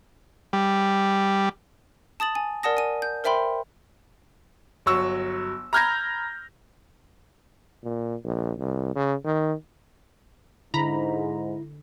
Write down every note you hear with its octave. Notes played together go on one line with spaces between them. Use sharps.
G3
A5 D#6 A6 F#7
G#5
A#4 D5 F#5 A5 D#6 A#6
G#5 D#7
G6
A#4 C5 E5 G5 B5 C6
G1 F#3 C#6 E6
A#5 B5 F6 G6 G#6 A#6
A#2
A#1
C2
C#3
D#3
G#2 D3 E4 A#5 B5